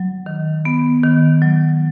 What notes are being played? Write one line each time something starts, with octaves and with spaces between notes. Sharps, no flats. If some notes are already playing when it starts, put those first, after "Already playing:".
Already playing: F#3
D#3
B3
D#3
F#3